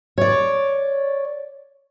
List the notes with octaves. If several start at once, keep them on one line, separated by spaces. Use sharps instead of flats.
C#5 D5